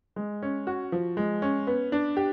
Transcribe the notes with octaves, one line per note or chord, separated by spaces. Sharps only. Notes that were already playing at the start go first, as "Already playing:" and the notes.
G#3
C#4
F#4
F3
G#3
C#4
B3
D4
G4